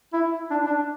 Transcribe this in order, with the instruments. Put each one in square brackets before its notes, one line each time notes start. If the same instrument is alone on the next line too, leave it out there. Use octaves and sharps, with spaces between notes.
[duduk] E4
D4
D4